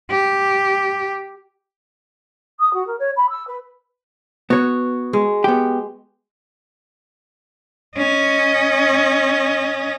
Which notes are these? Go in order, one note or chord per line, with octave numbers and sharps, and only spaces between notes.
G4
D#6
F#4
A#4
C#5
B5
E6
B4
B3 F#4 C#5
G#3
B3 G4
C#4 D#5